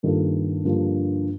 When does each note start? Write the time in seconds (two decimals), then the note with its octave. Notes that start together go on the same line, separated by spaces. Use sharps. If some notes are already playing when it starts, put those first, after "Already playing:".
0.03 G2 D#3 A#3 F4 A4
0.65 G2 D3 F3 A#3